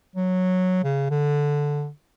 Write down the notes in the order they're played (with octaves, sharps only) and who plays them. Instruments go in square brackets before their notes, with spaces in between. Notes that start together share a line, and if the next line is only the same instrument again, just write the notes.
[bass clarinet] F#3
C#3
D3